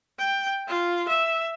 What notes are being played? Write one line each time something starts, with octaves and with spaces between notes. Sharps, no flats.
G5
F4
E5